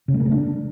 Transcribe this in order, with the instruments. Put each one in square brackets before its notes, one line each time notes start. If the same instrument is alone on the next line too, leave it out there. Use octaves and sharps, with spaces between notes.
[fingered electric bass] C#3
G#3
A#3
A3
D4